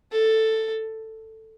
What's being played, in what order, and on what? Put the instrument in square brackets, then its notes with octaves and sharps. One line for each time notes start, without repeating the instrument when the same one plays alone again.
[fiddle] A4